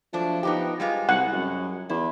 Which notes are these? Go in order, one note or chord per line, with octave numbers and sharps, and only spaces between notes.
F3 F#3 A3 D4
B3 D#4 G4
G3 G#3 F4
C2 F#5
F#2
E2 E4